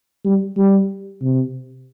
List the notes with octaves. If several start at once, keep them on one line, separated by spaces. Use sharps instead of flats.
G3
G3
C3